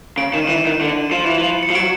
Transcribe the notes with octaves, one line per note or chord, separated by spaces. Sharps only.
C#3 D7
D#3 E7
D#7
E3 E7
D#3
D3
F3 E7
E3
F3
C#7
F3
F#3 D7